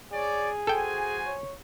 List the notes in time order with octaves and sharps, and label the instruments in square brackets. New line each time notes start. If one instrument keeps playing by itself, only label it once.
[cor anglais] G#4 [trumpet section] C#5 D5
[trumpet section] F#4 C5 G#5 [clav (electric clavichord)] A4 G5
[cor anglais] C#5